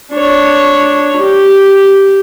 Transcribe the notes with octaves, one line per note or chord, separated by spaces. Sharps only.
D4 C#5
G4